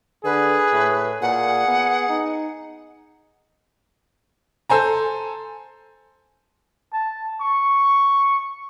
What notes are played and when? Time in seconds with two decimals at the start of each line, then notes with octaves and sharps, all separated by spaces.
0.24 D3 G#4 B4
0.73 A2
1.22 A#2 G#4 F#5
1.68 B3
2.10 D#4
4.70 A4 C5 G#5 A#5
6.93 A5
7.41 C#6